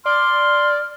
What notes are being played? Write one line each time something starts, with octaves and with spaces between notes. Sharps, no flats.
D5 C6 F6